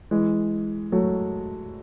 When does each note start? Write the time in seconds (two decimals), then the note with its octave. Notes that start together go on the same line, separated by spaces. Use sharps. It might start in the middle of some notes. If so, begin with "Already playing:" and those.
0.11 E3 G#3
0.92 F#3 A3